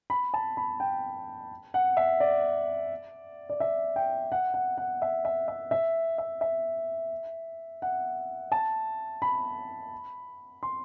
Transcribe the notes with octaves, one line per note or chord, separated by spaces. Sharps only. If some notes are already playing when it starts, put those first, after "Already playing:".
B5
A5
B5
G5
F#5
E5
D5
D5
E5
G5
F#5
F#5
F#5
E5
E5
E5
E5
E5
E5
F#5
A5
B5
C6